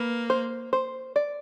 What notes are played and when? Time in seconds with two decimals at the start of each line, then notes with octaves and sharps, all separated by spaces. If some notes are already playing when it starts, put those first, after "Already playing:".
Already playing: A#3 B4
0.30 C5
0.73 C5
1.16 D5